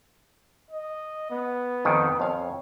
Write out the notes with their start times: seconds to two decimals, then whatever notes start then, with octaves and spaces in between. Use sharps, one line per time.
0.71 D#5
1.30 B3
1.85 F2 D#3
2.20 F2 C#5 F5 G#5